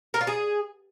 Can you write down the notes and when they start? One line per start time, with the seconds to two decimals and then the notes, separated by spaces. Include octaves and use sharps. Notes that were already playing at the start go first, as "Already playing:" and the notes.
0.14 A#4
0.21 F4
0.27 G#4